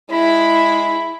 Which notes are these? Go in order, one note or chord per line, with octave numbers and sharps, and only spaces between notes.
G#3 E4 B5